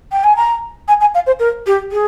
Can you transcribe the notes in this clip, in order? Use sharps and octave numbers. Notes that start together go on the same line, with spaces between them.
G5
G#5
A#5
G#5
G#5
F5
C5
A#4
G4
G#4